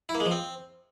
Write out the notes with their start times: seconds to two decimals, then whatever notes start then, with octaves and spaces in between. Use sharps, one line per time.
0.09 E4
0.15 A#3
0.20 G#3
0.26 F3
0.31 C4